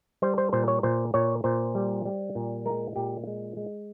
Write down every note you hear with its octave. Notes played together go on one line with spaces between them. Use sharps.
G3 C5
C5
A#2 C5
C#5
A#2 C5
A#2 C#5
A#2 C5
G3
G3
A#2
G#3 A#4
A#2 G4
G#3
G#3